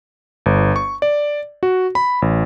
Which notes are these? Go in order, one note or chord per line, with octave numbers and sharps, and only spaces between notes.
G1
C#6
D5
F#4
B5
A1